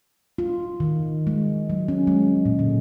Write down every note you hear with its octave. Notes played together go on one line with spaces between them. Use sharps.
F4
D#3
G#3
F#3
C#4
G#3
A#2
D3